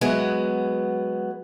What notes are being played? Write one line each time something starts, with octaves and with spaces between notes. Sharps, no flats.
F#3 G#3 B3